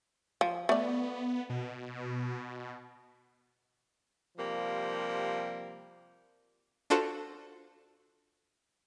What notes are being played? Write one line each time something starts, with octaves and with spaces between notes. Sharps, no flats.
F3
A3 B3 D5
B2
C3 F3 G3 A#3
D4 F4 F#4 A4 C5